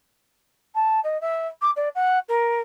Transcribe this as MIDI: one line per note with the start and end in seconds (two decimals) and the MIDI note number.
0.75 1.00 81
1.04 1.20 75
1.21 1.47 76
1.62 1.71 86
1.76 1.89 74
1.95 2.19 78
2.29 2.61 70